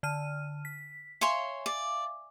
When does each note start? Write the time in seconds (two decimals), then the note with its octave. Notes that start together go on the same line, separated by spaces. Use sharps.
0.03 D3 F6 D#7
0.65 B6
1.21 C#5 E5 F5 G#5 C6
1.66 D5